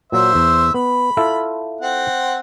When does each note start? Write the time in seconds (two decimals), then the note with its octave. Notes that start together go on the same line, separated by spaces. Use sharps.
0.12 A#2 F#3 C5 E5
0.35 E2
0.74 B3 B5
1.17 E4 F4 A4
1.81 C4 F#5